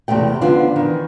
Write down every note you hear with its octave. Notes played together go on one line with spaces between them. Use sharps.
E2 C3 G#3 A3 G5
D3 F3 B3 D4 F4
D#3 E3